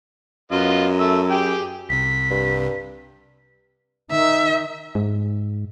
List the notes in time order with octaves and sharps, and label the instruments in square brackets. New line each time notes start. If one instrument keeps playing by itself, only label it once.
[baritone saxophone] F#2 [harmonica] B3 F4 D#5
[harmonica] A3 E6
G4 G#4 G5
[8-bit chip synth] C2 C3 [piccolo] B6
[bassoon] G2
[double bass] D#3 D#4 [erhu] E5
[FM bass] G#2